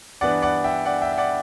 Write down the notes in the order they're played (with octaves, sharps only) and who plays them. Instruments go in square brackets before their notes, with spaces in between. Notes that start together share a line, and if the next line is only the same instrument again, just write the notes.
[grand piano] G2 E3 B3 D4 D5 F#5
D5 F#5
E5 G5
D5 F#5
E5 G5
E5
D5 F#5